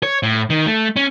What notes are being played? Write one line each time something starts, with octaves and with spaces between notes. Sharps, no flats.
C#5
A2
D#3
A3
C#4